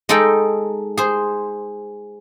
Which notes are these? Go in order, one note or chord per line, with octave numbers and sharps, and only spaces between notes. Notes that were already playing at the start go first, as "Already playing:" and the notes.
G#3 D#4 G#4 A4 G5
G#4 C5